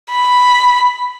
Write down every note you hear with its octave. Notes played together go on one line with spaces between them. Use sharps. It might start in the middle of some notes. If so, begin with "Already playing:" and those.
B5